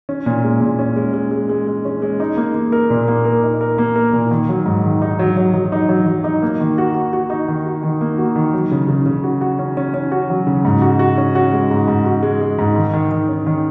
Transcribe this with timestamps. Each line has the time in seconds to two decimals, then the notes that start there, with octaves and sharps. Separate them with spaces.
0.09 C#4
0.26 A#2
0.44 G#3
0.61 A#2
0.79 C#4
0.96 G#3
1.14 G#3
1.31 G#3
1.49 G#3
1.67 G#3
1.85 C#4
2.02 G#3
2.20 D#4
2.37 A#3
2.54 A#3
2.72 A#4
2.90 A#2
3.08 A#3
3.25 A#4
3.43 D#4
3.61 A#4
3.78 A#3
3.96 A#4
4.13 A#2
4.31 D#3
4.49 F#3
4.66 G#2
4.84 D#3
5.02 D#4
5.19 F#3
5.37 F#3
5.54 F#3
5.72 D#4
5.89 F#3
6.06 F#3
6.24 D#4
6.42 A#3
6.60 D#3
6.78 F#4
6.94 F#4
7.13 F#4
7.30 D#4
7.48 D#3
7.66 F#4
7.83 D#3
8.01 A#3
8.18 F#4
8.36 D#3
8.54 F#3
8.71 C#3
8.89 C#3
9.06 C#3
9.24 F#4
9.41 F#4
9.59 C#4
9.77 C#4
9.94 C#4
10.12 F#4
10.30 F#3
10.47 C#3
10.65 G#2
10.82 F#4
10.99 F#4
11.17 C#4
11.35 F#4
11.53 G#3
11.71 G#2
11.88 G#2
12.06 F#4
12.23 G#3
12.41 G#3
12.59 G#2
12.76 D#3
12.93 D#3
13.11 D#3
13.28 C#4
13.47 D#3